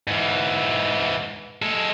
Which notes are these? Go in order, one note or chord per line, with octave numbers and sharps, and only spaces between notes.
G#2 E3
G#3 A4